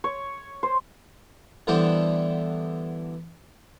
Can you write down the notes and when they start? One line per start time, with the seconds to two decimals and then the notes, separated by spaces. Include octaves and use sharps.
0.04 C#5
0.63 C5
1.67 D3 E3 G3 B3 E4 C5